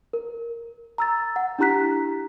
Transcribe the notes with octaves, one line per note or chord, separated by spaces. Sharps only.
A#4
A#5 E6 A6
F#5
D4 E4 G4 A#5 F#6 B6